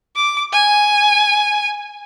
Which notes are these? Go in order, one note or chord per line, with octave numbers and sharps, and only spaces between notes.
D6
G#5